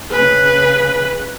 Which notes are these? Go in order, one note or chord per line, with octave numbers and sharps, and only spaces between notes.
C#3 G#4 B4